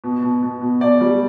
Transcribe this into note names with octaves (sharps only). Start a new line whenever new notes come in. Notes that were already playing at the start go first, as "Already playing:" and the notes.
B2
B2
B2
B2
B2 D5
G3